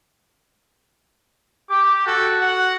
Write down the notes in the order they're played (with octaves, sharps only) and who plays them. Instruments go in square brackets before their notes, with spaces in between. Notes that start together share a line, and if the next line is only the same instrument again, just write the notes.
[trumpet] G4 [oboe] D6
[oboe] F#4 [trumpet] A4
[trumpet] F#5